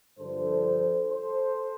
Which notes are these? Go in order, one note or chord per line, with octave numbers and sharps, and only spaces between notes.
G2 D3 F3 A4 C5
A4 C5